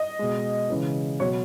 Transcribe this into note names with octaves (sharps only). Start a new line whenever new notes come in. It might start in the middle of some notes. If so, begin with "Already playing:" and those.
Already playing: D#5
B2 G#3
C#3 E3 G#3
B2 F#3 C#5